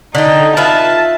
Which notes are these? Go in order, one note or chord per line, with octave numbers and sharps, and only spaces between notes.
D3 D#4 G5
F4 B4 E5 A5